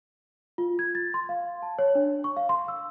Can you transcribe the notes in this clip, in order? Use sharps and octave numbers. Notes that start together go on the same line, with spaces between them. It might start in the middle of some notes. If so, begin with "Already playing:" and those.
F4
G#6
A6
C6
F5
A5
C#5
D4
C#6
F5
C6
E6